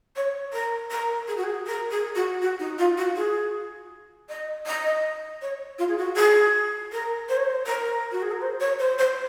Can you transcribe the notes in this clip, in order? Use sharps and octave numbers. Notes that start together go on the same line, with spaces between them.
C#5
A#4
A#4
G#4
F#4
G#4
A#4
G#4
F#4
F#4
D#4
F4
F#4
G#4
D#5
D#5
C#5
F4
G#4
F#4
G#4
A#4
C5
C#5
C5
A#4
F#4
G#4
A#4
C5
C#5
C5
C5